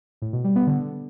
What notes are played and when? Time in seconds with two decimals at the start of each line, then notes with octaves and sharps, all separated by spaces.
0.22 A2
0.33 B2
0.44 G3
0.56 B3
0.67 D3